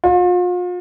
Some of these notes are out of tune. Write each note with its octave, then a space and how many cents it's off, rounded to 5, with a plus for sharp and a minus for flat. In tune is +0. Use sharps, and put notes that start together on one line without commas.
F4 +40